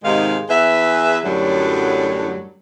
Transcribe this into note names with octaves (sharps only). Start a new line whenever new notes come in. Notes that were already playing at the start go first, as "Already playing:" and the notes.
G#2 C3 D#3 G#3 G4 F5
E2 G#4 B4 E5
F#2 A2 D3 F#3 G3